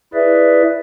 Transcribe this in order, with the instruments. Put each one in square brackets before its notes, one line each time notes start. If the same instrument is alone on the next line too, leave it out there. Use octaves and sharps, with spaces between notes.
[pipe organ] E4 G#4 B4 D5 E5